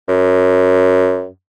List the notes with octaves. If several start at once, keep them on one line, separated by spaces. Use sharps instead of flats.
F#2